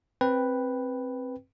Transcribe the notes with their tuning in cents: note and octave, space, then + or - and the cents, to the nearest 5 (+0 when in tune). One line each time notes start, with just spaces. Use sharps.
C4 +10 B4 +0 G5 +0